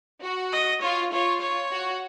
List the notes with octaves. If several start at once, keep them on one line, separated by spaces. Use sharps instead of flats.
F#4
D#5
F4 C#5
F4 C#5
C#5
F#4